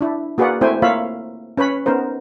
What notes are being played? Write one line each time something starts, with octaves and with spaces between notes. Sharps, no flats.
D4 E4
A#3 F#4 G#4 B4 D5 F#5
A3 C4 E4 C5 G5 G#5
A#3 F4 C#5 E5 F5 B5
C#4 B4 C#5 B5
B3 C#4 D#4 A#4 C5